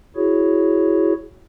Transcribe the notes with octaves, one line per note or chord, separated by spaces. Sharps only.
E4 F#4 G#4 C#5